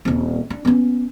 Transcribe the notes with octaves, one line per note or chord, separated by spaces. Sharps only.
D#1 C4
D4
B3 C#4